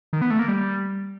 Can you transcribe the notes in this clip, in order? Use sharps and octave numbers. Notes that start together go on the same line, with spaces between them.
D#3
B3
A3
A#3
G3